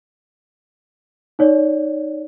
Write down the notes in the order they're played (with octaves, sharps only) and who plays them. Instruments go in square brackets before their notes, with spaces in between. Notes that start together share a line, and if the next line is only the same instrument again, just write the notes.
[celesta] D#4 C#5 D5